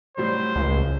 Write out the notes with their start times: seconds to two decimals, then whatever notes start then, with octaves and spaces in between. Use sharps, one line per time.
0.17 A2 F#3 G3 C5
0.56 C#2